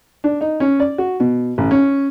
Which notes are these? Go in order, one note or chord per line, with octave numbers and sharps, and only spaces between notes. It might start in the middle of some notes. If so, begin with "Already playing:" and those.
D4
D#4
C#4
D5
F#4
B2
A1
C#4